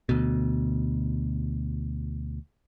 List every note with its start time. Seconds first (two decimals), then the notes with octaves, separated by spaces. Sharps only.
0.09 D2 B2